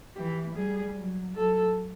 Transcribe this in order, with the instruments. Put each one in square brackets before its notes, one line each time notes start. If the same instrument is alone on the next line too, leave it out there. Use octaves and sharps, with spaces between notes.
[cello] E3 [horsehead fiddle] G4
[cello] G3 [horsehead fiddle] G#4
[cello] F#3
[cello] F#3 [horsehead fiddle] A4